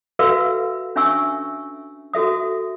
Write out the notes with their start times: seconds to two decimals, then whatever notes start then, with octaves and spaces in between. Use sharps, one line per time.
0.19 F#4 A4 B4 E5 F5 E6
0.96 C#4 D4 E5 G#5 C#6 E6
2.14 F#4 A4 E5 D#6